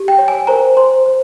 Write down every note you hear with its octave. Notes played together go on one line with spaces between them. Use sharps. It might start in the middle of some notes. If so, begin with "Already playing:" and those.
Already playing: G4
G5
C#5
G#5
A#4 C5 A#5
C5 C6
C5